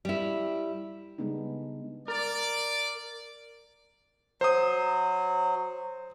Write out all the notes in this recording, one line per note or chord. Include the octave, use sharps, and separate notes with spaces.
G3 E4
C#3 G3 G#3 B3 D4 D#4
A#4 D5
F#3 C5 D#6